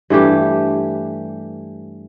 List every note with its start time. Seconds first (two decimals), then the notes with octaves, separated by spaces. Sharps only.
0.10 G2 E3 A3 G4